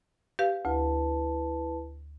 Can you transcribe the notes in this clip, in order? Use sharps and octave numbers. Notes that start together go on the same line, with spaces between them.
G4 B4 F5
D2 E4 B4 A5